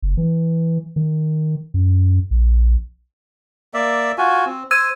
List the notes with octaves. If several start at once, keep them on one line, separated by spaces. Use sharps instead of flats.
F#1
E3
D#3
F#2
A#1
A#3 D5 E5
F4 F#4 G#5
C4
C5 E6 G#6 D#7